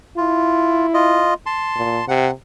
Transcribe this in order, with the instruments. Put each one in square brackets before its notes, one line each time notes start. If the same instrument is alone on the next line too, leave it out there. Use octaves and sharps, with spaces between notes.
[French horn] E4 [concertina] F4
[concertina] F4 D#5
A5 C6
[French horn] A#2
[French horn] C3 [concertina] F#5